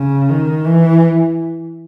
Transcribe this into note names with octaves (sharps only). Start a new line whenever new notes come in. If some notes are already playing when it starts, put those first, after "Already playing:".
Already playing: C#3
D#3
E3